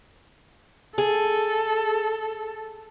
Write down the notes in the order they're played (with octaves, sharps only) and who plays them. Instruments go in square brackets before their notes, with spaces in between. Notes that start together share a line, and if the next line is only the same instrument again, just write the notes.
[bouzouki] G#4 [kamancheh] A4